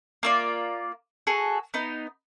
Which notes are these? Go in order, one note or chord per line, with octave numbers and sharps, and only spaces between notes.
A#3 F4 D5
F#4 G#4 A4
B3 D#4